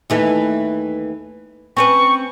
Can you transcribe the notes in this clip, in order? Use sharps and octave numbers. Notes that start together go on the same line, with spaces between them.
D#2 E3 A3
C4 C#4 B4 C#6